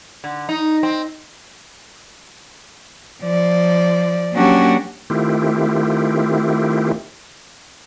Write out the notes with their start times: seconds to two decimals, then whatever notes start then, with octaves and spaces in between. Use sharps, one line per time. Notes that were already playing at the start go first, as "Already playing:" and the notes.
0.24 D3
0.49 D#4
0.83 C4
3.22 F3 D5
4.34 F#3 A#3 C#4 D4 F#4 G4
5.10 D#3 A3 C4 E4 F4 G4